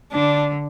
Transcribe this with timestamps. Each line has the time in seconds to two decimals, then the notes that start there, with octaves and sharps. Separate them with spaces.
0.12 D3 D4